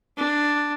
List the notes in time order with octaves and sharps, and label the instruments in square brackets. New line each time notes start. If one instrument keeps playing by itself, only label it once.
[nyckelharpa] D4